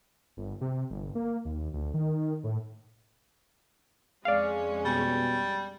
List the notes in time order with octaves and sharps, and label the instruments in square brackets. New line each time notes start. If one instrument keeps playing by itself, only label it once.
[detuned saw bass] G1
C3
G1
A#3
D#2
D2
D#3
A2
[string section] F2 G#3 C#4 [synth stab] D5 F5
[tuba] B2 [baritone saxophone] G3